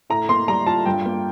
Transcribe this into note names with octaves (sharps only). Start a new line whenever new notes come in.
A2 A#5
A#3 C6
G3 A#5
F4 A5
G2 G5
A#3